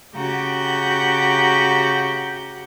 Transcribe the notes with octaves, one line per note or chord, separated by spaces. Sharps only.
C#3 F#4 G4 F#5 A#5 G6